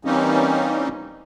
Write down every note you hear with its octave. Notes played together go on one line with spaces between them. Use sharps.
E3 G3 A#3 C4 C#4 D#4